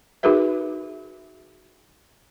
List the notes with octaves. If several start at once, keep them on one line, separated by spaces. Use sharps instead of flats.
D#4 F#4 G#4 A#4 B4 E5